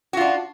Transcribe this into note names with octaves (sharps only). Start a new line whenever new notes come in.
D4 F4 F#4